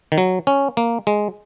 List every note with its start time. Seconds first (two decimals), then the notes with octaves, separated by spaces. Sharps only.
0.12 D#3
0.18 F#3
0.47 C#4
0.77 A#3
1.07 G#3